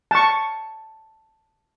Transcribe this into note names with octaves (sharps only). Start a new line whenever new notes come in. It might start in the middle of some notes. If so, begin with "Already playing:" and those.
A5 C#6